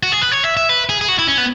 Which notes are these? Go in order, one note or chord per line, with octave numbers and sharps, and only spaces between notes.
F#4
G#4
B4
C#5
E5
E5
B4
G#4
G#4
F#4
E4
C#4
B3